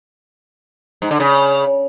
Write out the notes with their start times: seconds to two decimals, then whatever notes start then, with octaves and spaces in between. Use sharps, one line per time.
1.02 G#2
1.11 D3
1.20 C#3